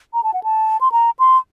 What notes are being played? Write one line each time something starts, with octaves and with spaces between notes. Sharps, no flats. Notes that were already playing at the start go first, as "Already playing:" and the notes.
A#5
A5
F#5
A5
C6
A#5
C6